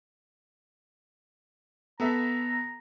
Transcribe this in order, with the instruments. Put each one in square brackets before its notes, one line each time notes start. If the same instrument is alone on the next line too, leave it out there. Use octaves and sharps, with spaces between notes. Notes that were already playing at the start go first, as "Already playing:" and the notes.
[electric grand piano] B3 A4 E5 [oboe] A#5